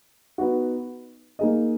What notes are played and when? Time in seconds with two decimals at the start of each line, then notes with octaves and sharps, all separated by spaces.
0.38 B3 D#4 F#4
1.39 A#3 D#4 G#4 D#5